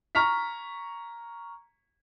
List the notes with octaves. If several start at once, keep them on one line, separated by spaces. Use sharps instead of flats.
A#5 C#6 F6 B6